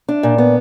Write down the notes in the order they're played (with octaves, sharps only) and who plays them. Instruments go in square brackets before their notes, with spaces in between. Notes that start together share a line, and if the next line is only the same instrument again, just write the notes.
[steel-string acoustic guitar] D4
A#2
B3